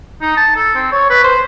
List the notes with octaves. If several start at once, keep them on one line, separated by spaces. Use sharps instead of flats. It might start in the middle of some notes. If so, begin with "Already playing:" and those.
D#4
A5
A4
C4
C#5
B4
C5